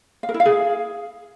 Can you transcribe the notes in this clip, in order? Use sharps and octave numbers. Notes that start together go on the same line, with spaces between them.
F5
A#4
E4
F5
G#4